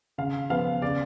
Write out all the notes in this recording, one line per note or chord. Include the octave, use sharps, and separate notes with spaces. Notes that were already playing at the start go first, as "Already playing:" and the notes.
C#3 F5
F3 B3 F5
C#3 D5